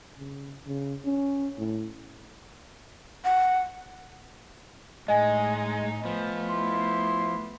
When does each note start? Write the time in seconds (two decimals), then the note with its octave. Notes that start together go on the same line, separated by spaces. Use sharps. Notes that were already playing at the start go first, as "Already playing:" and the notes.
0.18 C#3
0.67 C#3
1.05 C#4
1.58 A2
3.25 F#5
5.08 A2 G#3 D#4 D#5 G#5
6.05 F3 A3 B3
6.46 E4 C6